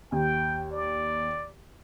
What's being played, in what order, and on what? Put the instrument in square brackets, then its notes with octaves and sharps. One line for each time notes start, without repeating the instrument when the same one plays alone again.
[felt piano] D#2 [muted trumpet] G5
[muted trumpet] D5